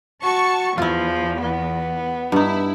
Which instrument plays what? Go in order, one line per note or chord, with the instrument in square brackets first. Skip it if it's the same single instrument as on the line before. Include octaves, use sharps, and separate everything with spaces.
[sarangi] F#4 [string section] A5 C#6
[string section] E2 [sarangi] F3 [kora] E4 F4
[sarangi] B3
[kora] G2 D#4 [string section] E4